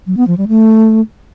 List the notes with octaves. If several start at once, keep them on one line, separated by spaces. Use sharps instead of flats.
F#3
B3
F3
G3
A3